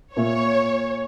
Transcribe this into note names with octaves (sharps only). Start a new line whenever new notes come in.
A#2 C#5 E5